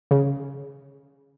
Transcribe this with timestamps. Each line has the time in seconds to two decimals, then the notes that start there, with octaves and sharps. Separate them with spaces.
0.11 C#3